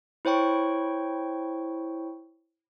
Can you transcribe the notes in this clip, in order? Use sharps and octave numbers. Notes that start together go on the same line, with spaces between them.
E4 C5 C#5 G5 C#6